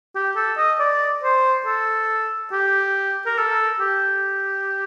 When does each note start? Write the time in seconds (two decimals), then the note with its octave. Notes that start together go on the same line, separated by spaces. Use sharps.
0.15 G4
0.36 A4
0.58 D#5
0.80 D5
1.23 C5
1.66 A4
2.52 G4
3.26 A#4
3.38 A4
3.80 G4